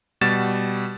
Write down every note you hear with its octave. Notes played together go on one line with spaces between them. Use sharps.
B2 G3 F#4 A6 E7